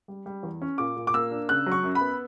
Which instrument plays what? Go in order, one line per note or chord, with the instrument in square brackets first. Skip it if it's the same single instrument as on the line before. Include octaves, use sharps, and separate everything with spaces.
[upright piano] G3
G3
E2
C#4
A#2 D6
A#2
D6
A#3 E6
D4
C#3 F#6
F#3
C#6
F#2
B5
B3